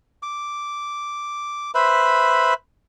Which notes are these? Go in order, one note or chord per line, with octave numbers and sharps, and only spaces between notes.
D6
B4 C5 E5 B5